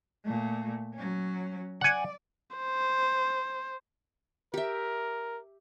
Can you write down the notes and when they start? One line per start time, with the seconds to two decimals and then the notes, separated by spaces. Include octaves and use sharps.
0.24 A#2 A3
0.94 F#3 C#4
1.81 D5 F#5 G#5
2.57 C5
4.54 G4 A#4 E5